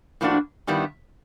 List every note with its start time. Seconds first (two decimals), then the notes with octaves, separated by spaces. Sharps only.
0.21 A2 F3 A#3 D4 F#4
0.67 G2 D#3 G3 B3 E4